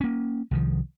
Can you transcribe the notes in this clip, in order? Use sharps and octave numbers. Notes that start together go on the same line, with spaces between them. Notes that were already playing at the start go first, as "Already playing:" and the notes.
A#3 C#4
C2 D#3 F3